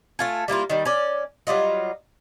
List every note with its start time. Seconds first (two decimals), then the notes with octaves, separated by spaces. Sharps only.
0.19 A3 F4 G#5
0.48 G3 A#3 E4 F4
0.70 D#3 G3
0.85 C#4 D5
1.47 F#3 G3 F4 D#5